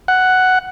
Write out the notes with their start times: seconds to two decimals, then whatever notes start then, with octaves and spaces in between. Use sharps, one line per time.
0.08 F#5